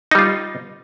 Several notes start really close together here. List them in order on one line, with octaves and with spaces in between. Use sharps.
D#4 G3 F4